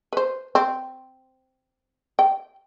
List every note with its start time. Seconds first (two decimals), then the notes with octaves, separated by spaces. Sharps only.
0.13 B4 C5
0.55 C4
2.19 G5